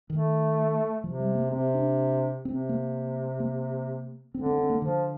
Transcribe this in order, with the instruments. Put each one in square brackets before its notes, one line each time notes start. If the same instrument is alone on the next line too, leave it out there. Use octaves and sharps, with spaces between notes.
[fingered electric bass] D#3 [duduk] A3
[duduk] C3 [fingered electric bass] F3
[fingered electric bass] G3
A#3
[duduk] C3 [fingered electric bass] C4
[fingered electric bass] D4
[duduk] C3 [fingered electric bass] C4
[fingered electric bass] A#3
A#3
[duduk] D3 [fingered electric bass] C4
[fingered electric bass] C4
C4
A#3
[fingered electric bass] D3 [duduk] F3